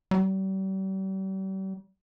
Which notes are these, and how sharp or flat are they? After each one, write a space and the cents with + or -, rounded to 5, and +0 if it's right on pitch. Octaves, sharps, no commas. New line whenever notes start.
G3 -40